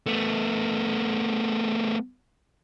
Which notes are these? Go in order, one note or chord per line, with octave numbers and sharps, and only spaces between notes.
A3 B3